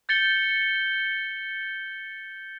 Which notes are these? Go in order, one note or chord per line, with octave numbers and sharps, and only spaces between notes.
G6 A6 C#7 G7